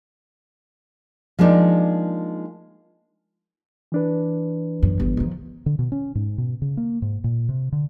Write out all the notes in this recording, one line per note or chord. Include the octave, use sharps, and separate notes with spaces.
F3 G#3 A#3 D4 D#4
E3 D4 B4
F#2
G1
D#3 F3
D3
B2
C#4
G#2
B2
C#3
A#3
G#2
A#2
C3
D3